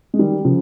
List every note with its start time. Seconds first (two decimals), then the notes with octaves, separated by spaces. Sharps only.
0.14 G#3
0.19 D#3 G3
0.45 C#3 F3